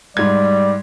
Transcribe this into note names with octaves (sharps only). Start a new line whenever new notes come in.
G#2 G3 D5 G#6